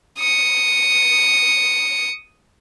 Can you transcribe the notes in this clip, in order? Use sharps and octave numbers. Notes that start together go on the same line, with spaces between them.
D#6 C#7